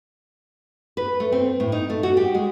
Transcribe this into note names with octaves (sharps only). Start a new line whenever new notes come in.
B4
A3
C4
A2
D#4
A3
F#4
G4
G#3